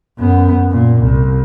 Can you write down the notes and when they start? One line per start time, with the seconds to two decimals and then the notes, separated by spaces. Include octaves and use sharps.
0.19 F#2 B3
0.70 A#2
1.02 C2